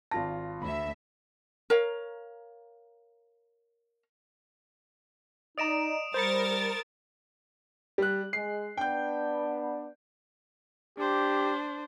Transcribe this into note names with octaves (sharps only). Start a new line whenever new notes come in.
G#1 F4 A5 A#6
D2 E5 B5
A#4 C#5 F5
D#4 D5 D#5 A#5 D#6 D7 E7
G3 A#4 C5 B5 A6 C#7
G3 F#6
G#3 C7
B3 D4 G5 G6
D4 G4 C5